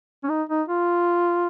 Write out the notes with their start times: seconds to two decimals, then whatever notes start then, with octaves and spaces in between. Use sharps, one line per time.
0.24 C#4
0.29 D#4
0.49 D#4
0.68 F4